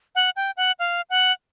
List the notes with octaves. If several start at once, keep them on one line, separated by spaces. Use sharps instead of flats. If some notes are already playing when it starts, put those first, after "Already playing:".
F#5
G5
F#5
F5
F#5